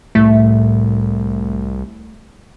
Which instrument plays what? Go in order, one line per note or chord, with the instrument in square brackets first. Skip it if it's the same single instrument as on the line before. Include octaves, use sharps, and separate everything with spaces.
[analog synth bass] C2 [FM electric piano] A2 [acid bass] A3